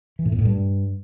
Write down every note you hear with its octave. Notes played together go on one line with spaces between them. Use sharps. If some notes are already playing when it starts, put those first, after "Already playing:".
E3
A2
A#2
A2
G2